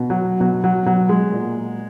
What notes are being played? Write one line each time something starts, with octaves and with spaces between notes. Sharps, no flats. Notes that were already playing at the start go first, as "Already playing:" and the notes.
Already playing: B2
F#3
B2 F#3
F#3
B2 F#3
G#3
A#2